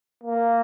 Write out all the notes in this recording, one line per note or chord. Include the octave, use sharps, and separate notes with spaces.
A#3